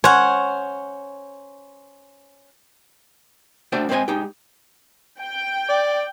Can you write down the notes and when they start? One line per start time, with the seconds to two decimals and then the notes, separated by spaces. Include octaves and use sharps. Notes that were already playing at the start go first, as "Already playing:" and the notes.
0.04 C#4 C5 C#5 F#5
3.72 A3 D4 F#4 C5 D5 G5
3.89 G#3 C4 B4 C5 D#5 G#5
4.08 G#3 D#4 G4
5.20 G5
5.69 D5